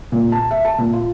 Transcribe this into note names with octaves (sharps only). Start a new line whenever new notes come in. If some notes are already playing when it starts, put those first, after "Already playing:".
A#2
A5
E5
A5
A#2
F4